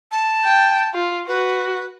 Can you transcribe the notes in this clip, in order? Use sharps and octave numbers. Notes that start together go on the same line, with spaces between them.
A5
G5
F4
F#4 B4